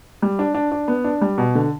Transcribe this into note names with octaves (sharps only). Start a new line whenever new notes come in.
G3
D4
D4
D4
B3
D4
G3
B2
D3